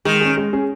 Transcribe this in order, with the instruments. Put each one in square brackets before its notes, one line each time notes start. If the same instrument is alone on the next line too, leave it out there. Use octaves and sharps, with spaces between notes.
[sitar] D#3 [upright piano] G#3
[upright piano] C#4 G#4
G#3
C#4 G#4